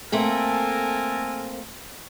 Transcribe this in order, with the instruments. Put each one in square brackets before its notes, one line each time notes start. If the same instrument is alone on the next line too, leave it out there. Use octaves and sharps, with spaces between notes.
[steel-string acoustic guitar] A3 A#3 C4 [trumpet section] A4 A#4 G#5